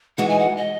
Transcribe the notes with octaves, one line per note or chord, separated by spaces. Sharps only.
E3 G#3 D#4 F#4 F#5
G#5
F#5
D#5